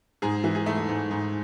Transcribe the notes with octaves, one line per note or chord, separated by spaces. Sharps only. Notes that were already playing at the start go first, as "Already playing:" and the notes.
G#2 G#4
E3
G#4
A3
G#2
G#2